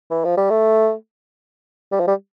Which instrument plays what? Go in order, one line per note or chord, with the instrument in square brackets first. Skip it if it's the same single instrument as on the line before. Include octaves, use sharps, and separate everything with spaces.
[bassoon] E3
F3
G3
A3
G3
F3
G3